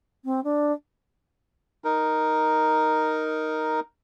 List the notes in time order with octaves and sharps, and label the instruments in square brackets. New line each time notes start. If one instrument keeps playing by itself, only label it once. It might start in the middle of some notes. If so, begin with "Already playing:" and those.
[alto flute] C4
D4
[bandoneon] D#4 A#4